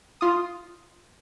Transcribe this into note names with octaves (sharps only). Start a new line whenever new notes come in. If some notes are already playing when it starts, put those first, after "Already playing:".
F4 D#6